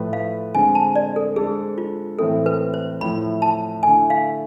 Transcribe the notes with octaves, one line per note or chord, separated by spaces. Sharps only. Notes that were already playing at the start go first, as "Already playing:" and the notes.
Already playing: A2 F3 A3 E4 B4
F5
D3 G#3 C4 G#5
A5
D5
A4
G#3 D4 G#4 A4 C5
F4
A2 E3 A3 C4 E4 A4
B4
C5
A2 F3 A3 E4 B5
A5
D3 A3 E4 G#5
F5